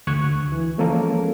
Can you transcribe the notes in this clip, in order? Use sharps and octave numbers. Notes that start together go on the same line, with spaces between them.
D2 D3 C#6 F#6 G#6
E3
F3 G#3 A#3 C#4 A4 A#4